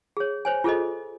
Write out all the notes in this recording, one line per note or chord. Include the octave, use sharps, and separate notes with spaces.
G#4 C#5
C5 C#5 G#5
F4 G#4 A4 C5 D#5